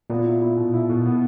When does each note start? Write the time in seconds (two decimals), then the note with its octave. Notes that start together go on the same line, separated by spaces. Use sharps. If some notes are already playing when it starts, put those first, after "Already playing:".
0.10 A#2 B3
0.26 E4
0.41 E4
0.57 B2
0.73 E4
0.90 B2
1.06 B3